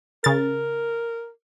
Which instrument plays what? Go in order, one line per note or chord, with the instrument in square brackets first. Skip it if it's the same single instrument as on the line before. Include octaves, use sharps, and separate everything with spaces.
[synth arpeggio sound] C#3 A6 [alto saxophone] A#4